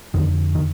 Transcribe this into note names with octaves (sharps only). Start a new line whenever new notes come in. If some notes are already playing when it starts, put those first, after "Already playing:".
F2 D3 D#3
D#3